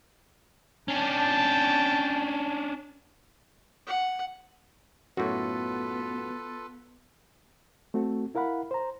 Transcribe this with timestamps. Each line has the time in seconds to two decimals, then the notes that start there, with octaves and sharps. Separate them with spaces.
0.88 C#4 D4 G5 A5
3.87 F#5
5.17 F#2 A2 B3 F4 F#4 A4 B4
7.94 A3 C4 F#4 A4
8.35 E4 A#4 F5 F#5 B5
8.71 C5 A#5